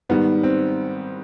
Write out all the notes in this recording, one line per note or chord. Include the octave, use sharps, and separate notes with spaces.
G#2 D#3 G3 B3
C4